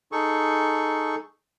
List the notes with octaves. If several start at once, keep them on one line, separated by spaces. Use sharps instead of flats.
D#4 G#4 A4 C#6